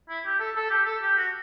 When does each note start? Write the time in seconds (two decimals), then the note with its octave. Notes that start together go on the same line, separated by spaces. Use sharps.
0.09 E4
0.26 G4
0.40 A4
0.56 A4
0.70 G4
0.86 A4
1.02 G4
1.17 F#4